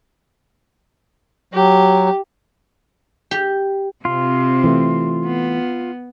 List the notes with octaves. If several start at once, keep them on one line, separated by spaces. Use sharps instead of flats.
F#3 G4
G4
C3 C4 F4
E3 A3
B3